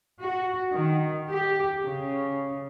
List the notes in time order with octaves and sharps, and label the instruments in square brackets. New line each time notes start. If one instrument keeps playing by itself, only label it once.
[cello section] F#4
D#3
G4
C#3